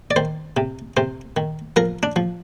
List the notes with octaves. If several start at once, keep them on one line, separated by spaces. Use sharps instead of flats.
D5
D#3 C5
C3
C3 C5
D#3
F3 A#4
D4
F3